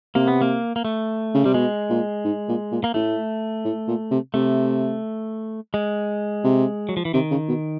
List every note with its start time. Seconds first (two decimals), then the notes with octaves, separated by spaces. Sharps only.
0.15 C3 A#3
0.27 B3
0.41 A#3
0.76 A#3
0.85 A3
1.34 C#3
1.45 C3 G3
1.54 B2 G#3
1.90 A#2
2.24 G#2
2.49 A#2
2.71 A#2
2.84 A#3
2.94 A2 A3
3.65 A2
3.87 A#2
4.11 C3
4.34 C3 A3
5.74 G#3
6.44 C3
6.89 F#3
6.97 F3
7.05 E3
7.14 C3 D#3
7.31 C#3
7.48 B2